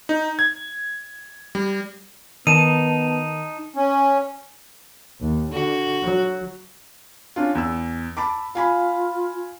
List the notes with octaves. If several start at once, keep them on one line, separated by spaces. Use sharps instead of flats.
D#4
G#6
G3
D#3 B3 D#4 A5 D#7
C#4
D#2
D3 F#4
F#3
C#4 D4 F4
E2 E6
A5 B5 D6
F4 F5 G#5 B5